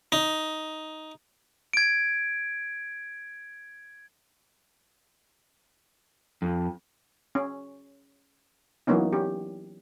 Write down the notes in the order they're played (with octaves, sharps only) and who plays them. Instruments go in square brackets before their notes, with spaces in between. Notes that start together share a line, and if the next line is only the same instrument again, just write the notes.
[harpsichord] D#4
[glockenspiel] G#6 D7
[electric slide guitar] F2
[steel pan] C#4
E3 F#3 A#3 B3 C#4 D#4
C#4 G4